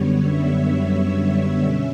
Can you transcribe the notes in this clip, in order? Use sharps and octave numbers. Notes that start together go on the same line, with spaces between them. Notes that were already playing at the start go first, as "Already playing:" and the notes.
Already playing: F#2 D3 G3 B3 C#5
E5
B2 G3 C#4